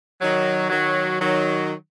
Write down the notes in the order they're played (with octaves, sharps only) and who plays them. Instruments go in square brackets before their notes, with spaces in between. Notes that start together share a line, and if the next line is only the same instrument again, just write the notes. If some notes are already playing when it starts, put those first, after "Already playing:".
[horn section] D#3 F#3
D#3 F#3
D#3 F#3